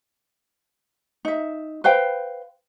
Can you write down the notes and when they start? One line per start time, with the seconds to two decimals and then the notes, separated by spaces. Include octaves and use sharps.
1.25 D#4 E5
1.84 B4 C5 F5 G5